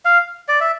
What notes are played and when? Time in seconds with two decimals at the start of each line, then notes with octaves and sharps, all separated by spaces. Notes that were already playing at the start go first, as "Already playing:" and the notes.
0.05 F5
0.49 D5
0.61 E5